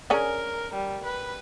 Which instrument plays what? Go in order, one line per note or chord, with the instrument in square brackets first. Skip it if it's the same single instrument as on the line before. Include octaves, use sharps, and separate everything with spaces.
[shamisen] D3 C#4 G#4 [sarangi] A#4
[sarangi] G3
B4